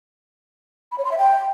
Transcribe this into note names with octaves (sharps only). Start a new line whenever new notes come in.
B5
C#5
C6
E5
G5